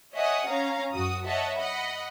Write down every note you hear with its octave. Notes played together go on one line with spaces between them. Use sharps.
C#5 D#5 E5 F#5 G#5 D#6
C#4 C#5 F5 A#5
F#2 F#4 D#6
C#5 D#5 E5 F#5 A5
D#5 F#5 B5